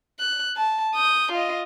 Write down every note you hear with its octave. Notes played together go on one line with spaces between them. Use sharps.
F#6
A5
D#6 G6
F4 D#5